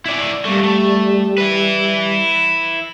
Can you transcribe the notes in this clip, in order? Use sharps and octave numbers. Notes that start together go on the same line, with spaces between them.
E4 D5
G3 A3 A#3
A3
E4 B4